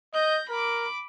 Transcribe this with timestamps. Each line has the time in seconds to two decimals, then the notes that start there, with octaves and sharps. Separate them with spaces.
0.14 D#5 G6 A#6
0.50 A#4 B5 D6